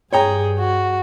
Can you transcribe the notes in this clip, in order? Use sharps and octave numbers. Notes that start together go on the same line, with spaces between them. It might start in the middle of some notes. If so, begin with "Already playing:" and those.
G2 G#4 C#5 G5 A#5
F#4